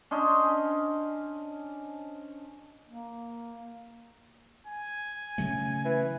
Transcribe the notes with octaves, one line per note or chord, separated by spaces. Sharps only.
C#4 D4 C5 D#5
A#3
G#5
C#3 F#3 A3
E3